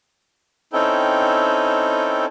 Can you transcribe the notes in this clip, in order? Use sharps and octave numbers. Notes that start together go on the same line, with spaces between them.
C4 C#4 D#4 E4 A4 G5